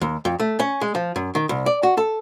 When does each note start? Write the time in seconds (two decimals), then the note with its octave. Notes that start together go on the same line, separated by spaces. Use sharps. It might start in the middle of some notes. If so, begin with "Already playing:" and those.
0.01 D#2
0.25 F2
0.40 A3
0.59 C#4
0.81 G#3
0.95 F3
1.16 F#2
1.35 D#3
1.49 C2
1.66 D5
1.83 F#4
1.97 A4